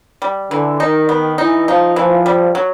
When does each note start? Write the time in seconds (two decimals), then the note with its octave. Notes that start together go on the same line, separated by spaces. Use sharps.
0.22 G3
0.51 D3 E3
0.80 D#3 D#4
1.09 B3
1.38 E3 D#4
1.68 F3 D#4
1.96 E3 F3
2.26 G3
2.55 F#3